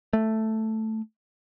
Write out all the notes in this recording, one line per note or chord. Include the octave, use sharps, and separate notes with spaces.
A3